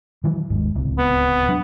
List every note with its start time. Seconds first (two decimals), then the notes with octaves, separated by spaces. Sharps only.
0.24 D#3 E3 F#3
0.50 G1 D#2 G#2
0.75 D1 C#2 C3
0.98 B3
1.49 F#3 D4